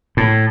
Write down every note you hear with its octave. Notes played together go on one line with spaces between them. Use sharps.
A2